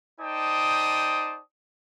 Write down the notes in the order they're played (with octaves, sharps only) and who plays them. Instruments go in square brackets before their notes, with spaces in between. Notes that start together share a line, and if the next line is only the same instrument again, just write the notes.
[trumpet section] D#4 C5 D5 G5 A5 D#6